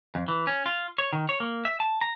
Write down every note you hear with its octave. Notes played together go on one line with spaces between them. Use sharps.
F2
E3
C#4
F4
C#5
D#3
C#5
A#3
E5
A5
A#5